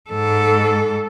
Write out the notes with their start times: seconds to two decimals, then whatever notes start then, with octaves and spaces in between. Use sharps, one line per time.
0.10 G#2 A4